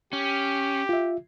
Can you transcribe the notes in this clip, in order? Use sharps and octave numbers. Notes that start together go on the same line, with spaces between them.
C#4 G4
F4 E5